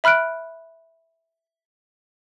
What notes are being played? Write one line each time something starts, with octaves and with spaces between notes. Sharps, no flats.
E5 B5 F6 F#6 D7